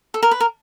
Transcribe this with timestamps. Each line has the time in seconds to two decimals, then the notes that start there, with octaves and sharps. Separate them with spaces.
0.14 A4
0.23 A#4
0.31 B4
0.40 A#4